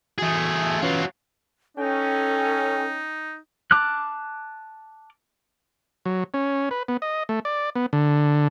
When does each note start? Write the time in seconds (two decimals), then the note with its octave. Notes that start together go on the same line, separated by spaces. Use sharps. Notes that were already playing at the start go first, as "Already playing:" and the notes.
0.18 E3 A3 F#4 G#4
0.82 E3 F#3 C#4 F4 B4
1.77 C#4 D#4 A4 G5
3.71 A5 D6 F6 F#6
6.06 F#3
6.34 C#4
6.71 B4
6.88 B3
7.02 D#5
7.29 A3
7.45 D5
7.75 B3
7.93 D3